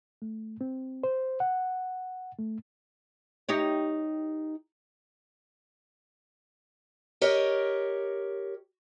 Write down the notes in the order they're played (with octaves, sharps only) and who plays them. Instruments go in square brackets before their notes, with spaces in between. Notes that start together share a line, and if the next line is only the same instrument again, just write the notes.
[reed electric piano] A3
C4
C5
F#5
A3
[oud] D#4 G4 C#5
[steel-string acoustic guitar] G4 A#4 C#5 D#5